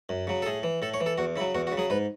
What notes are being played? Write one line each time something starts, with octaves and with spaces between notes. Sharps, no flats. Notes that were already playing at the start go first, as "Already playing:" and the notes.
F#2
C#3 F#3
A4
A2 G#4
E3
A2 A4
C#5
E3
A4
E2 F#4
C#3 F#3 E4
E2 F#4
F#4
C#3
F#3 G#4
G#2 B4